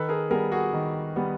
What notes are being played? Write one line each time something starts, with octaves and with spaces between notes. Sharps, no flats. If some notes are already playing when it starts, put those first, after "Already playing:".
Already playing: D#3 A4 B4
G#4 A#4
G3 B3 G#4 A#4
F#4 G#4
D#3
G3 B3